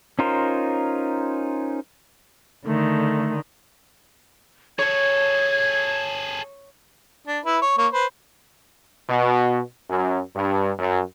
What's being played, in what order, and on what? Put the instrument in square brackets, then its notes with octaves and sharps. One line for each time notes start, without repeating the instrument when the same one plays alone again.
[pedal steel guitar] C#4 D#4 F4 A#4 C5
[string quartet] D3 D#3 [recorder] A3
[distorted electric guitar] G#4 A4 [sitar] C#5 [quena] G#6
[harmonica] D4
E4 B4
C#5
A#3 C#5
B4 C5
[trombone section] B2
F#2
G2
F#2